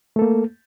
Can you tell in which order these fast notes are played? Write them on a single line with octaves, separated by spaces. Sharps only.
A3 A4 A#3